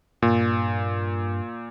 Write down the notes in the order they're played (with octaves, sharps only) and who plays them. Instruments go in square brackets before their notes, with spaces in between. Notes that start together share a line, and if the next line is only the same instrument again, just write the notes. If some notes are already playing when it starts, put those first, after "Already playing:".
[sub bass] G2 [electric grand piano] A#2